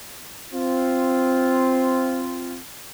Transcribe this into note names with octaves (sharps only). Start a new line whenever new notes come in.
C4 F4